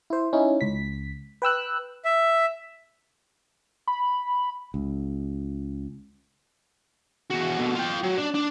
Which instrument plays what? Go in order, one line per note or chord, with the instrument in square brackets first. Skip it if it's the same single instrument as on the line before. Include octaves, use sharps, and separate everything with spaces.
[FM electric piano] E4 C5
C#4 D#4 E4
C#2 B6
B4 G5 E6 F#6
[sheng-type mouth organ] E5
[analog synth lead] B5
[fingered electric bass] C#2
[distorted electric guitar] E2 F#4
B2 D3
F4 G5
F#3
D4
D4